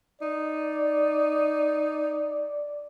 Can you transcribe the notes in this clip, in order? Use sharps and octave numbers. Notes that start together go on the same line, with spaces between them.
D#4 D5